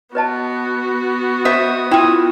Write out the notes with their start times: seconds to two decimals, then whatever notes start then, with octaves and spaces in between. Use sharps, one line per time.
0.15 B3 F#4 B4 D#5 A5
1.45 C5 D#5 E5 F#5 D#6
1.91 E4 F4 G5